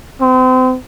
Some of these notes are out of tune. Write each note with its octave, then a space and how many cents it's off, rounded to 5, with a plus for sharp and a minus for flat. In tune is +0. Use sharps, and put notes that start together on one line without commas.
C4 -35